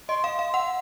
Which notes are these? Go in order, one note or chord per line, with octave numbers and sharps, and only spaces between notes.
D#5 C6
F5
C6
F5
C6
F#5